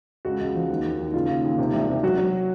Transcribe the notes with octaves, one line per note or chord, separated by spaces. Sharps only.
C#2 F#4
C#2
F3
D#2
D#2
D#2
C#3 F4
D#2
D#2
C3
C2
C3
F#3 F#4
F#3